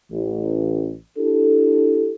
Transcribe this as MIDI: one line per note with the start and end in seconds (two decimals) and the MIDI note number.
0.11 0.94 33
1.18 2.11 62
1.18 2.11 64
1.18 2.11 67
1.18 2.11 69